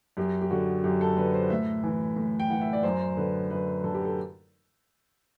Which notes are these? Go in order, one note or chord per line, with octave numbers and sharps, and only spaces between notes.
F#2 G4
G4
D3 F#4
F#2 G4
A4
D3 B4
C5
A2 E5
E3
A2
G5
E3 F#5
E5
D5
F#2 C5
D3 B4
F#2 B4
D3 A4
G4
A4